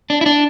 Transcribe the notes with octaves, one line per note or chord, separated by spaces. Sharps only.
D4
E4
D4